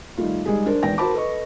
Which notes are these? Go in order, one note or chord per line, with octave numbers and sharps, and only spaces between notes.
D#3 G3 A3 F4
G3 G#3 D#4 G4 G#4
D4 A#4 C5
G#1 E2 G5 A#6
F#4 A#4 C5 A5 B5 D6
A4 B4 D#5 C#6